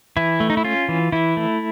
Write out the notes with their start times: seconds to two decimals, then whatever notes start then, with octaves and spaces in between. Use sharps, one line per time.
0.17 E3 E4
0.40 A3
0.50 D#4
0.57 E4
0.65 C#4 F4
0.89 E3
1.12 E3 E4
1.37 A3